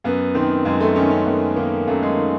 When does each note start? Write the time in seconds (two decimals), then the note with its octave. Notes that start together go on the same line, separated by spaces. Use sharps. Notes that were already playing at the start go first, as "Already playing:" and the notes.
0.04 F#2 B3
0.35 D#3 C4
0.65 F#2 G#3
0.80 A3
0.96 D#3 C#4
1.11 C#4
1.26 F#2 B3
1.56 D#3 A#3
1.87 F#2 A3
2.03 G#3
2.17 D#3